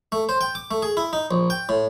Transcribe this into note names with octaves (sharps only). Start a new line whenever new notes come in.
A3
C5
G5
D6
A3
G#4
E4
D#4
A#1
G5
A2